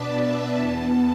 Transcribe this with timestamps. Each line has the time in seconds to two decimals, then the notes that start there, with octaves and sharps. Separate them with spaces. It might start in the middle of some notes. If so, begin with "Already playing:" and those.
Already playing: B2 B3 D4 B4 D5 A5
0.22 E5
0.58 E2 E3 B3 A5